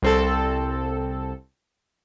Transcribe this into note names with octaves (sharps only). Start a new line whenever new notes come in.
C2 C4 A4